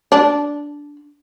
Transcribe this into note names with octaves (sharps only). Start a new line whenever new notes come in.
D4